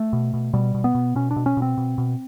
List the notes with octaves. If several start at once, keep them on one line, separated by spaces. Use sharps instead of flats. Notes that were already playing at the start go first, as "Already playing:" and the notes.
Already playing: A3
B2
B2
B2 G3
B2
B3
B2
B2 C#4
D4
B2
C#4
B2
C4
B2
B2